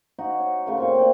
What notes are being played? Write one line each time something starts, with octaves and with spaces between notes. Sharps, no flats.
D#4 F#4 F#5
C#5
C#3 A3 F4 A#4
A#2 C4 C#6
D5 G5